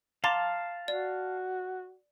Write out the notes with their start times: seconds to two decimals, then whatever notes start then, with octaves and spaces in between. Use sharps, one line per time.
0.24 F5 A5 A#5 C6 D6
0.88 F#4 D5